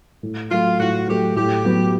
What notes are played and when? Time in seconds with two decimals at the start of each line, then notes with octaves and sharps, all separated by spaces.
0.23 A2
0.50 F#3 A3 F4
0.79 A2 F#4
1.08 F#3 A3 G4
1.36 A2 G4
1.65 F#3 B3